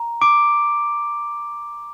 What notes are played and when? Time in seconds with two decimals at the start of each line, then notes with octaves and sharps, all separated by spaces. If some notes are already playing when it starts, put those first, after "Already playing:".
Already playing: A#5
0.22 D6 D7